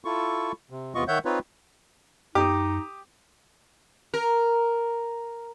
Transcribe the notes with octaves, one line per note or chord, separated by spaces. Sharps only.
E4 F4 A4 C#6
C3
E2 C3 B3 F4 D#5 C#6
D#3 C#5 E5 F#5 G6
C4 D#4 F4 B4 C#5
F#2 D#4 G4 D6 D#6
A#4